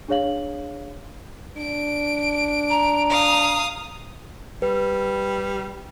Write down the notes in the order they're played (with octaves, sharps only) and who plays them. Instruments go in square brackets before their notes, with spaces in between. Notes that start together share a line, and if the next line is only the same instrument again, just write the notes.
[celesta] D4 G#4 C#5 F5 F#7
[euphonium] D4 [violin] D7
[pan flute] A#5
[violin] F5 D#6
[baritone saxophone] G3 [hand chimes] B4